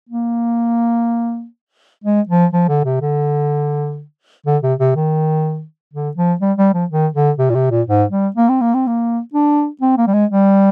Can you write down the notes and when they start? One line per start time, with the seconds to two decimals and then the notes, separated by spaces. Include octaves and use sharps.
0.09 A#3
2.04 G#3
2.29 F3
2.53 F3
2.69 D3
2.85 C3
3.01 D3
4.46 D3
4.63 C3
4.79 C3
4.96 D#3
5.93 D3
6.17 F3
6.41 G3
6.58 G3
6.74 F3
6.90 D#3
7.14 D3
7.38 C3
7.50 A#2
7.55 C3
7.71 A#2
7.87 G#2
8.11 G3
8.36 A#3
8.49 C4
8.61 A#3
8.74 C4
8.87 A#3
9.33 D4
9.81 C4
9.98 A#3
10.07 G3
10.14 G#3
10.30 G3